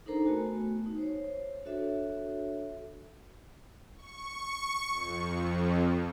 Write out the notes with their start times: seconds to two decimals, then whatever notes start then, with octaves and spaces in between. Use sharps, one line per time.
0.06 D4 D#4 A4 A#4 C5 A#5
0.25 A3 B3 F#4 G#5
0.86 D#4
0.98 C5 C#5
1.65 D4 F#4 A4 C#5 E5
3.96 C#6
4.88 F2